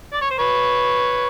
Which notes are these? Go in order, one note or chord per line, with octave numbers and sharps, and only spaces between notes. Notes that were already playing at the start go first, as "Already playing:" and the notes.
D5
C#5
C5
B4 C#5